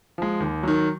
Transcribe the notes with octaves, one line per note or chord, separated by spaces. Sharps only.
F3 G#3
D#2
D#3 F#3